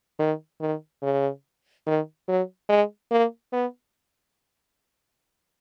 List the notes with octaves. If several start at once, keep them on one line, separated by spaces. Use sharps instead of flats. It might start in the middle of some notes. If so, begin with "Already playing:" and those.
D#3
D#3
C#3
D#3
F#3
G#3
A#3
B3